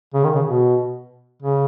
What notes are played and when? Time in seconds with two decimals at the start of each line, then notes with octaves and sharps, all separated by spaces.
0.14 C#3
0.24 D#3
0.35 C#3
0.46 B2
1.42 C#3